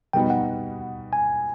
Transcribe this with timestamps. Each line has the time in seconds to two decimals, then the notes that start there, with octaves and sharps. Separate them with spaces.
0.13 B2 G3 B3 D#4 F#4 G5
0.30 F#5
1.13 G#5